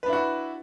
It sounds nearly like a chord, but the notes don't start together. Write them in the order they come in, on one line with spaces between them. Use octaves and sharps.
B4 D4 E4 F#4